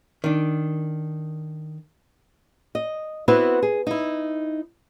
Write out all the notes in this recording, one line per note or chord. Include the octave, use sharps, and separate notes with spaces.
D#3 D4
D#5
B3 C4 E4 F#4 B4
G#4
D#4 E4